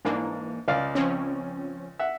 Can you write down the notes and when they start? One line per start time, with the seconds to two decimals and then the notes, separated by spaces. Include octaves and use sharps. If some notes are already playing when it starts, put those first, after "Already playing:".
0.05 G#2 E3 A#3 D4
0.68 C#2 D5 F5
0.95 F3 C4 C#4
1.99 E5 F#5